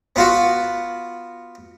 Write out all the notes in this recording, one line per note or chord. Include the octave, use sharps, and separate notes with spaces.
B3 F4 F#4